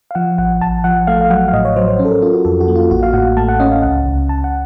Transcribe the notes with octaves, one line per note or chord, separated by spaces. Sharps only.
F5
F3 F#5
A1 F#5
A1 A5
F3 F#5
A3 F5
F5
F#3 F#5
F5
A2 D#5
C#5
F#3 C5
C5
C#4
A4
A#4
C#4 F4
F#4
F2 A4
F#4
A#3
F4
A1 F#4
F5
A2 F#5
A3 A5
F#5
C#4 D#5
F5
C#2 F#5
C#2
C#2 A5
F#5